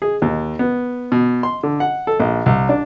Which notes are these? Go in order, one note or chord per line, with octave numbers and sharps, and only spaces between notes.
G#4
D#2
B3
B2
C6
D3
F#5
A4
A#1
C2
D4